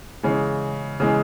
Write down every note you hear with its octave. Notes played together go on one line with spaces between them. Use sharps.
C#3 E3 G#3
C#3 E3 G#3